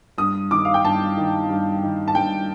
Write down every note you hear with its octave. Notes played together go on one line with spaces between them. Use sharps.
G2 D#6
D#3 D6
F5
G5
G2 A5
D#3
G2
D#3
A5
G2 G5